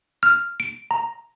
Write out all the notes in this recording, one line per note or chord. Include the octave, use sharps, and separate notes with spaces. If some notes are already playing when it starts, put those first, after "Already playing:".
F6
D7
A#5